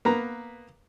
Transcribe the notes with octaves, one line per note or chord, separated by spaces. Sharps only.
A#3 B3 B4 A#5